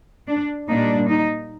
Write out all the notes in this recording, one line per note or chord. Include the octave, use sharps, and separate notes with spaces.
D4
A#2 G3 A#3 D4 D#4
D#4